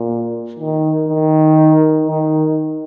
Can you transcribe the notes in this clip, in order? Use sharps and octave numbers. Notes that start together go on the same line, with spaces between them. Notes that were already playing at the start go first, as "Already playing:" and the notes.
Already playing: A#2
D#3
D#3
D#3